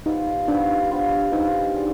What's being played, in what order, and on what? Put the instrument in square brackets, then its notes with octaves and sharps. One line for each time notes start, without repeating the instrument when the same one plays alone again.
[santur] G3 B3 F4 C5 [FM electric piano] D#4
[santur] G3 B3 F4 C5 [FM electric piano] D4
[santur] G3 B3 F4 C5
[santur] G3 B3 F4 C5 [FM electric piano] D#4
[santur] D4 G#4 D5 F5